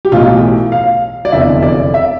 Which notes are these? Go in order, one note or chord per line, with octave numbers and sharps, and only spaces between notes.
G4
B1 A2 E3 F4
F5
D5
F1 E2 D3 E5
D5
E5